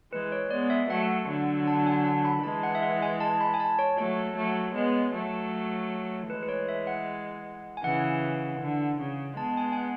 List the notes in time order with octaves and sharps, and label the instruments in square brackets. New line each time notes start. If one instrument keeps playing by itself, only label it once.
[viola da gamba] E3 G#3 [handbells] B4
[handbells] C#5
[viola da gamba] G#3 B3 [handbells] D5
[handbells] E5
[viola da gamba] F#3 A3 [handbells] F#5
[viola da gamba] D3 F#3
[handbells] A5
G#5
A5
B5
[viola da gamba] E3 G#3 [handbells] A5
[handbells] F#5
E5
F#5
G#5
A5
B5
G#5
A5
C#5
[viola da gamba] F#3 A3 [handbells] C#5
[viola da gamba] F#3 A3
G#3 B3
F#3 A3
[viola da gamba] E3 G#3 [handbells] B4
[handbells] B4
C#5
E5
F#5
G#5
[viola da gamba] C#3 E3 [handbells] F#5
[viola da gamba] D3
C#3
[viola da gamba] G#3 B3 [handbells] A5
[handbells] G#5
G#5
F#5